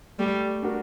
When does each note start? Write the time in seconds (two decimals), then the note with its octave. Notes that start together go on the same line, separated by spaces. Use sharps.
0.19 G3 A3
0.63 D4 F#4 A#4